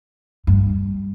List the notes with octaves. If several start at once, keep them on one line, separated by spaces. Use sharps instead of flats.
G2